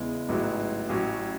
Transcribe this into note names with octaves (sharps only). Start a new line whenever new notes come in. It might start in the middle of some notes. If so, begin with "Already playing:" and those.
Already playing: E2 C#3 G#3 B3 E4
A1 G#2 F#3 B3 E4
A1 A2 F#3 C#4 E4